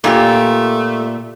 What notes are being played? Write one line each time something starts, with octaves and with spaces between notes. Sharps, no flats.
A#2 A3 F4 G4